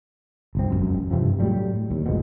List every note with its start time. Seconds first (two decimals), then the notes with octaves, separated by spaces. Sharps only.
0.55 G1 C2 C4
0.70 E1 C#2 F#2
1.11 G2 C3 E3 F3
1.40 A2 F#3 G3
1.90 D#2
2.06 F1 F2 G#2 B2